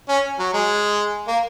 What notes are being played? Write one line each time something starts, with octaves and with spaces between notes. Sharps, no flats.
C#4
F#3
G#3
A#3